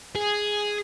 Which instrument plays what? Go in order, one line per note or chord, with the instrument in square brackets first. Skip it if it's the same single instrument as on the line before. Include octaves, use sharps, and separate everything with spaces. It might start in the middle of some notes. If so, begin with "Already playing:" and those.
[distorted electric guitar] G#4